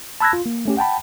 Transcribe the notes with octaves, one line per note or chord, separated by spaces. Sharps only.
A5 B5 E6 F#6 G#6 A#6
F4
A#3
A3 C#4 G4
F#5 G5 A5 B5